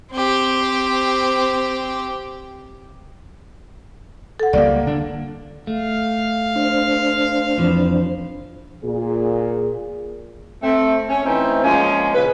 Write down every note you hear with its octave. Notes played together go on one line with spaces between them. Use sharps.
C4 G4
A4 F#5
C#2 G3 A#3 D5 F5
D3 D4
A3 F5
D4 C5
F2 E3 F3
A#2 G#4
A3 C4
C#4
E3 A3 C4 C#4 D#4
F3 G#3 A#3 C#4
A#2 C#3 B4